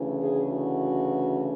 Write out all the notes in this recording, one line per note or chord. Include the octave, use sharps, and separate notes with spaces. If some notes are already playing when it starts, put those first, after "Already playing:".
Already playing: D2 C#3 E3
G#4
F#4